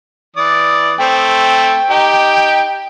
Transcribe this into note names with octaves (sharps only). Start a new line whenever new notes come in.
E3 D5 D#6
A3 C4 G5
D#4 G4